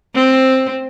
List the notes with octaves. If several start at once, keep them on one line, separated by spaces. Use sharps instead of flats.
C4